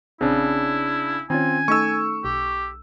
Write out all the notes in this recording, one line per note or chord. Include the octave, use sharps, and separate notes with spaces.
A#1 C#3 C4 D4 E4
D#3 C4 C#4 F4 G#5
A3 D#4 A4 C#6 E6
B1 G4